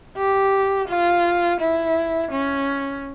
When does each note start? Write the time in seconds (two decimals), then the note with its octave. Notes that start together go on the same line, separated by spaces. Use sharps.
0.17 G4
0.89 F4
1.60 E4
2.32 C#4